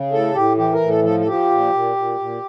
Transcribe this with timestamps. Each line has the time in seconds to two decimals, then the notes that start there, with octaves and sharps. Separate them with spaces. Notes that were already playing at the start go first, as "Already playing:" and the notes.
Already playing: C#3
0.12 A2 A4
0.35 A2 G4
0.57 E3 G4
0.73 A#4
0.80 A2
0.89 A4
1.03 F3 A4
1.20 A4
1.26 F3 G4
1.51 A#2
1.73 A#2
1.96 A#2
2.19 A#2